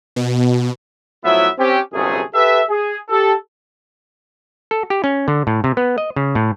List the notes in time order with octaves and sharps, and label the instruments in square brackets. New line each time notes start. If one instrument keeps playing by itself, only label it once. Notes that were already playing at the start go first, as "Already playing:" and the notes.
[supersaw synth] B2
[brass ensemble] A2 F3 F#3 B3 E4 E5
C4 C#4 G4
G1 F#2 C3 A3 G#4
G4 A4 B4 E5
G#4
G4 A4
[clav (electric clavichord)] A4
G4
C#4
D3
A2
C3
B3
D#5
C#3
A2